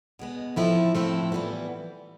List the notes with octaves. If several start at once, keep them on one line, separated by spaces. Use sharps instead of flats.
B2 G#3 B3
A2 F3 A3 C4 E4
A2 F3 A3 C4 E4
E3 G3 B3